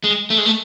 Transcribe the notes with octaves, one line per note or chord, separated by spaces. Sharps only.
G#3
A3
G#3
A3